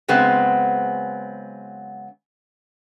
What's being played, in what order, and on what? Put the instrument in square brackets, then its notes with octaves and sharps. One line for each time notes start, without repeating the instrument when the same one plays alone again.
[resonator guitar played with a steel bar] C#3 F#3 G#3 B3 C4